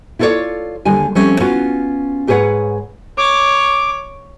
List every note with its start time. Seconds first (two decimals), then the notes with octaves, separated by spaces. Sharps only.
0.19 E4 F4 A4 A#4 C#5 D5
0.85 D#2 D3 G3 G#5
1.15 F3 G3 A3 C4 C#4
1.40 B3 C#4 F4 F#4
2.27 G#2 G4 G#4 B4 C#5 F#5
3.17 C#5 D6